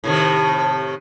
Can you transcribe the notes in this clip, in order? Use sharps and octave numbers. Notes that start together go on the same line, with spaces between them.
A2 C3 D#3